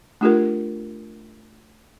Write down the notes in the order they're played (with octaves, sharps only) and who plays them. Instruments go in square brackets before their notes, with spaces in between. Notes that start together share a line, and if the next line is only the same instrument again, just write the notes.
[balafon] A3 D4 F4 G4 A4 A#4